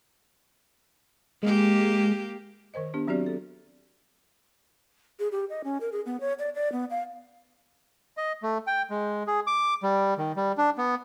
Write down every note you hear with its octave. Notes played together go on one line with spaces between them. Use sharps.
G#3 A#3 G4
D#3 A#4 C5 D#5
B3 D4 G4
F#3 C4 F#4 G4 D5
A4
G#4
G4
D#5
C#4
A#4
G#4
B3
C#5
D5
D5
B3
F5
D#5
A3
G5
G#3
G#4
D6
G3
D#3
G3
D4
B3